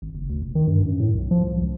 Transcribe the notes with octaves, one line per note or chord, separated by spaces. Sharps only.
G#1
F#1
D2
F1
D#3
G2
F#2
A2
B1
F3
C2
C#2